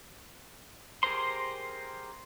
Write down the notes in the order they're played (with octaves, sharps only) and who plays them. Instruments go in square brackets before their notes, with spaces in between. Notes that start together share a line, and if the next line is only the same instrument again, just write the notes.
[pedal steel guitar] G4 G#4 A#4 C5 C6